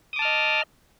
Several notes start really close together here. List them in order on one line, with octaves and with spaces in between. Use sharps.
D#6 D6 A5 F6 D#5